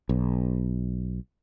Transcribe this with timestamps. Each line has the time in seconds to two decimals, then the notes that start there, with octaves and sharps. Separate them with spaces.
0.09 B1